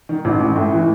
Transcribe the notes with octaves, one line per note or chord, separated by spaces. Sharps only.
D#3
A1
A1
A2
E3